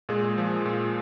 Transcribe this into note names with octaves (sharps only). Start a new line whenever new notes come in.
A#2 G#3 G#4
F3
A#2